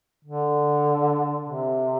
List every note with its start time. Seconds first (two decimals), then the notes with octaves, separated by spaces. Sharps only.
0.25 D3
1.46 C3